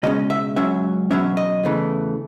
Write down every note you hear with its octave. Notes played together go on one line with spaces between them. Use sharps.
C#2 B2 G#3 C#4 D#5
E5
C#2 C#3 F#3 C#4 E5
E2 B2 F#3 C#4 E5
D#5
E2 C#3 E3 A3